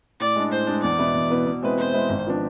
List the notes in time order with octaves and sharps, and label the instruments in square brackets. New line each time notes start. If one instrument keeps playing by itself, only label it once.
[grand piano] A2 [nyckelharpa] D5
[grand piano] G#3 D4
[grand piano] A2 [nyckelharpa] C5
[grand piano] G#3 D4
[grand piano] E2 [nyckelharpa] D5
[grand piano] B2 B3 E4 B4
E2
B2 B3 E4 B4
B2
G#3 C4 E4 B4
[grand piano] B2 [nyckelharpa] C5
[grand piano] G#3 C4 E4 B4
G#1
F3 B3 D4